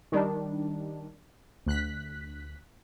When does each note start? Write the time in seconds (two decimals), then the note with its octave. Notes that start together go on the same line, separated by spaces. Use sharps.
0.12 D#3 G3 D4
1.66 D2 F#6 B6